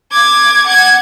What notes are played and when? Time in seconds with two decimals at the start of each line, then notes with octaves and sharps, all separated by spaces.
0.12 D6 G#6
0.67 F#5 G#6